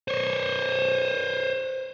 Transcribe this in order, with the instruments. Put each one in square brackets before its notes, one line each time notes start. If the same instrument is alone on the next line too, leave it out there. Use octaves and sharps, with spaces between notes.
[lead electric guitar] C5 C#5